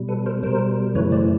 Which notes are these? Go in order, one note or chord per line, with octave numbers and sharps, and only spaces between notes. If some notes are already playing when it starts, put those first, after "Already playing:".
Already playing: B2 G3
A4 B4
A#4 C5
B2 G3 A#4 C5
F#2 C#3 E3 A3 B4 C#5
C5 D5